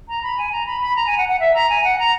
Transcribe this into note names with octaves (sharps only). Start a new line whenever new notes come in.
A#5
B5
G#5
A#5
B5
B5
A#5
G#5
F#5
F#5
E5
A#5
G#5
F#5
A#5